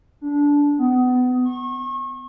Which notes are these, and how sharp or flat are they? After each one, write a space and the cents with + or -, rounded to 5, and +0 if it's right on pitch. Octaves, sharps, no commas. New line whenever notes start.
D4 -20
B3 +25
C#6 -35